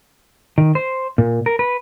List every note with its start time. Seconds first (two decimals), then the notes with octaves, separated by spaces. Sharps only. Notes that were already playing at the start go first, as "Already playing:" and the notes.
0.58 D#3
0.75 C5
1.18 A#2
1.46 A#4
1.59 B4